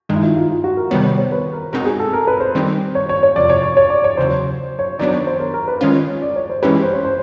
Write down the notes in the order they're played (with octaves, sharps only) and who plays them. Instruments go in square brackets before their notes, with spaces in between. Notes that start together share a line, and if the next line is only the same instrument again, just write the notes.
[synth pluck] G2 D#3 G#3 [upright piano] D#4
[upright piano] E4
F4
F4
F4
F#4
A#4
[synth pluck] C3 D#3 G3 B3 [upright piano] C#5
[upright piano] C#5
C5
B4
A#4
[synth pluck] B2 G#3 C4 D#4 F#4 [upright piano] A#4
[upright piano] G#4
A4
A#4
B4
C5
[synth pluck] D#3 G3 C4 D#4 G4
[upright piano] C#5
C#5
C#5
[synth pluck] F2 C3 F3 [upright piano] D5
[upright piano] C#5
C#5
C#5
D5
C#5
[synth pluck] E2 C#3 F#3 [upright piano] C5
[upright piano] C#5
[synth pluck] D#3 F#3 B3 D4 [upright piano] D5
[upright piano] C#5
C5
A#4
A#4
B4
[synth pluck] D#3 G#3 C#4 F4 [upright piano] C#5
[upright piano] D5
C#5
C5
[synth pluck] E3 G#3 C#4 E4 G4 [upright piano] B4
[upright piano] C5
C#5
C5